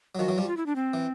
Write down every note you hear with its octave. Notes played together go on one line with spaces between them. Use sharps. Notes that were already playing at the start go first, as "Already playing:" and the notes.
F#3
D#3 F3 F#4
E3 F#3
F3 G3
F#4
F4
E4
D4
C4
E3